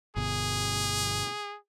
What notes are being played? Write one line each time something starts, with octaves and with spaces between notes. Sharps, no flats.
G1 B2 G#4